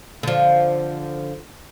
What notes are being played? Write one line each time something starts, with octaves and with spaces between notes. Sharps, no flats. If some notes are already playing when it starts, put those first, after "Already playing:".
D3 F3